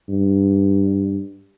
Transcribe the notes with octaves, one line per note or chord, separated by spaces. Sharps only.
G2